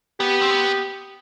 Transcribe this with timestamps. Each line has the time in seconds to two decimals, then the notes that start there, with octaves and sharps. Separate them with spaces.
0.20 B3 G4
0.41 C4
0.50 B3